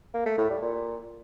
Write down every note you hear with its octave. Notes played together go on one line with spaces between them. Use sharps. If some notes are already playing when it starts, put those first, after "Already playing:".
A#3
A3
A2
G3
A#2